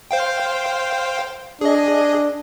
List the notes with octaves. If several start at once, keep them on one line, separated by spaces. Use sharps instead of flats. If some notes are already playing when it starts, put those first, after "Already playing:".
C5 F5 G5
D4 G#4 D#5